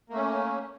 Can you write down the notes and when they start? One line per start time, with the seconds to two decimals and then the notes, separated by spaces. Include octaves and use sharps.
0.10 A#3
0.13 A3
0.16 C#4